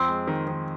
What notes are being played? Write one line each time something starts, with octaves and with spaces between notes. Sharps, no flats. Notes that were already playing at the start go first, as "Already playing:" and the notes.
Already playing: F2 C4
G#3
D#3
D#3